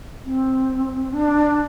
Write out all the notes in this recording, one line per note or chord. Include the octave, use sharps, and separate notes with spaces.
C4
D4